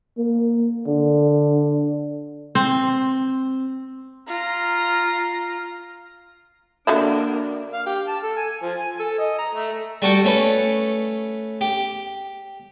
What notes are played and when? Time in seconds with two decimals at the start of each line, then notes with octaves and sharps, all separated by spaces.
0.18 A#3
0.87 D3
2.55 C4
4.28 F4 A#5
6.87 D3 A#3 D4 F#4 E5
7.74 F5
7.86 G4
8.07 A5
8.24 A4
8.37 G#5
8.62 F3
8.79 G#5
9.00 A4
9.19 D#5
9.39 A#5
9.54 A3
10.02 G3 F#4 A4 F#5 G5
10.24 A3 C#4 A4 B4
11.61 G4